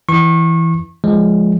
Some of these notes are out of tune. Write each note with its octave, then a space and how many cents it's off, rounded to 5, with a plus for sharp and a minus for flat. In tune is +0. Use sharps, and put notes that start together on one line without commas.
E3 +0 C#6 -30
F3 +0 G#3 +0